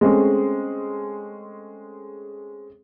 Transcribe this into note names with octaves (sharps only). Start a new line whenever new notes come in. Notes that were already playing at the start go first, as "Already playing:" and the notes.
G#3 A3 C4 C#4 G#4